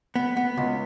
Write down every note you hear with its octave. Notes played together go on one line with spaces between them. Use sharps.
B3
B3
C#2